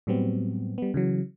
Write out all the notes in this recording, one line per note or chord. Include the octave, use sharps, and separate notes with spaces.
A2 F#3 G3 B3 C4
G3 B3
C#3 E3 F#3